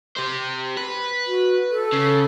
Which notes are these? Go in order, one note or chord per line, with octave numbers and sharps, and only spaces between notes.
G4 C5
B4
F#4
A4
C#3